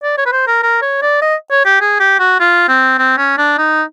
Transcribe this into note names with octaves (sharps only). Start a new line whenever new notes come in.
D5
C#5
B4
C5
A#4
A#4
C#5
D5
D#5
C#5
G4
G#4
G4
F#4
F4
C4
C4
C#4
D4
D#4